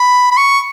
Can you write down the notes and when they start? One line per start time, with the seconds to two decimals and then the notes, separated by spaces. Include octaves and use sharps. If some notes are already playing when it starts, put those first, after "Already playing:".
Already playing: B5
0.31 B5
0.37 C#6